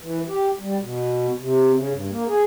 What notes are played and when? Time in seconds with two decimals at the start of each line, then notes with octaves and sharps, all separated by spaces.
0.01 E3
0.28 G4
0.59 G3
0.81 B2
1.38 C3
1.75 C#3
1.91 G2
2.10 A#3
2.27 G#4